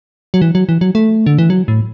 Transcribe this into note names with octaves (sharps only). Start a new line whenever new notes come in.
F#3
E3
F#3
E3
F#3
A3
D3
E3
F#3
A2